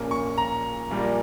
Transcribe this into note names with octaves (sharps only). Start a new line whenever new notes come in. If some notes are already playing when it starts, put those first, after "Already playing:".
Already playing: A#1 A#2 A#3 C#4
C#6
A#5
A#1 A#2 G3 A#3